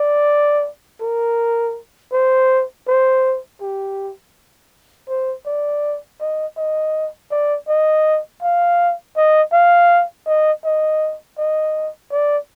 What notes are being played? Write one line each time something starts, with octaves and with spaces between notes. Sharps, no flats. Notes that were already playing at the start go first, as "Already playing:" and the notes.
Already playing: D5
A#4
C5
C5
G4
C5
D5
D#5
D#5
D5
D#5
F5
D#5
F5
D#5
D#5
D#5
D5